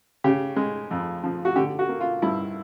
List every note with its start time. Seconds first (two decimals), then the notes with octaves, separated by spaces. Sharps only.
0.24 C#3 G4
0.56 G#3
0.91 F2
1.24 F3
1.45 F#4
1.56 D3 G4
1.79 F#4
1.89 A#3
2.00 F4
2.22 G2 E4